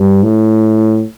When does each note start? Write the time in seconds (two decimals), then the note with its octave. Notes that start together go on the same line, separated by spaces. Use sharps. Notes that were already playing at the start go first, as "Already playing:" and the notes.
Already playing: G2
0.23 A2